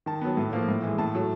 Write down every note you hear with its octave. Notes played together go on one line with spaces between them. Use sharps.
D#3 A5
F#3 B3
A2
F3 A#3
A2
E3 G#3
A2 A5
F#3 A3